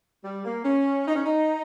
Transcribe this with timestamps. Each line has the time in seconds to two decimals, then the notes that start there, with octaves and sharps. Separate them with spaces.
0.24 G3
0.45 A#3
0.65 C#4
1.07 D#4
1.15 C#4
1.26 D#4